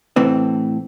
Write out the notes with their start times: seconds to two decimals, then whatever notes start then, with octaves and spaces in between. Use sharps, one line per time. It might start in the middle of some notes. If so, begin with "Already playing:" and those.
0.16 A2 E3 C4